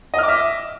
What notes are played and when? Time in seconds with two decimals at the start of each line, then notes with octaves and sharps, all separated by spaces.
0.14 D#5
0.19 F6
0.23 D6
0.28 E5